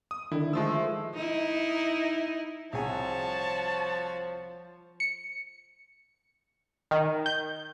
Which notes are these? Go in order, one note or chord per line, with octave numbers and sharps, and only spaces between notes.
D#6
D3 D#3 E4
F3 G#3 A3 F4 E6
D#4 E4
C2 F3 F#4 G#4 C5 C#5 G#5 A5
C#7
D#3
G6